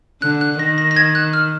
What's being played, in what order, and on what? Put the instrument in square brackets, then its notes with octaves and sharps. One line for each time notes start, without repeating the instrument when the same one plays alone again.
[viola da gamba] D3 [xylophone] F#6
[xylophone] F#6
[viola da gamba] D#3 [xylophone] A#6
[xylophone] A#6
A#6
G#6
F#6
F6